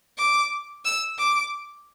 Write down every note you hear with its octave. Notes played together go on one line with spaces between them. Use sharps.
D6
E6
D6